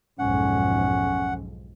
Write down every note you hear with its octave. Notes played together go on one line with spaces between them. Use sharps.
B1 F2 G#2 C#4 F#5